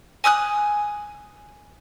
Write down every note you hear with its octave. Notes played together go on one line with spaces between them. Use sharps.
G#5 D#6 F6 F#6